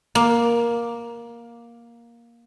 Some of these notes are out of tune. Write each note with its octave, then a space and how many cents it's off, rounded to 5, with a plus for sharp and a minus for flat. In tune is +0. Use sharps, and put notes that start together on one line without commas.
A#3 +10